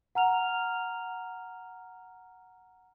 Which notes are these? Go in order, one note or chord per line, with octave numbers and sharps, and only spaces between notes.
F#5 A#5 F6 F7